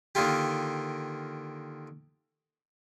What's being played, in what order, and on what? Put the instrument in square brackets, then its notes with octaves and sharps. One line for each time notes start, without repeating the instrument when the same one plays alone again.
[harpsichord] D3 D#3 A#3 F4 G4